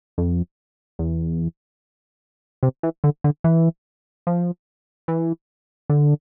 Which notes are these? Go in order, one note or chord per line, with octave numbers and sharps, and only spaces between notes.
F2
E2
C3
E3
D3
D3
E3
F3
E3
D3